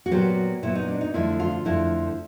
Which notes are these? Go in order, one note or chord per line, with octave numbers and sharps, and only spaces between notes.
F#4
A#2 F#3 B3 G4
A#2 F#3 B3 E4
D#4
D4
D#4
F2 D3 F3 A3 E4
F4
F2 D3 F3 A3 E4